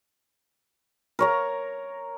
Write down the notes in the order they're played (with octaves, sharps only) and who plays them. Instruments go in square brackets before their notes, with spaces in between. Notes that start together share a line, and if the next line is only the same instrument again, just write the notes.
[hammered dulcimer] A#4 C#5 A#5